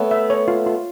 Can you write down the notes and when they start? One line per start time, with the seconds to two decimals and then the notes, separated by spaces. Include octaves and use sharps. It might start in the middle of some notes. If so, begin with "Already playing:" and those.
Already playing: A3 B3 C#5
0.11 E5
0.30 C#5
0.48 F4
0.66 F4